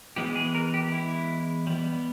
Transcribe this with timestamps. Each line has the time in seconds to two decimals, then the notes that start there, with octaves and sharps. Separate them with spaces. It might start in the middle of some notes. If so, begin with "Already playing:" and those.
0.16 E3 G#3 B3 G4
0.36 G#4
0.55 A#4
0.74 G4
0.92 E4
1.67 G3 B3